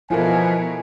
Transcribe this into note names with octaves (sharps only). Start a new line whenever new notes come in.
B2 F3 E4 A4 A#4 G#5